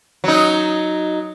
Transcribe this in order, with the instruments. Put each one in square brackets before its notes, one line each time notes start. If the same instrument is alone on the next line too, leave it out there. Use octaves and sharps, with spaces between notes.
[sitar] F#3 D#4